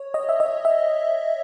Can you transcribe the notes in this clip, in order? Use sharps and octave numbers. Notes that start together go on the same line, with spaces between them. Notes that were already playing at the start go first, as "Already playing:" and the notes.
Already playing: C#5
D#5
E5
D#5
E5